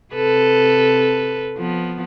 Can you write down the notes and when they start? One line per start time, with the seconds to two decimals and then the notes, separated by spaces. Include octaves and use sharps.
0.14 C3 A4 B4
1.57 F3 B3